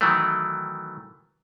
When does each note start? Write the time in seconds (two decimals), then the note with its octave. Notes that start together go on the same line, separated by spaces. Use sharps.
0.01 D#3 E3 F#3 A3